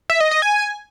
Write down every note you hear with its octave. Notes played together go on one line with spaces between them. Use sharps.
E5
D#5
D#5
G#5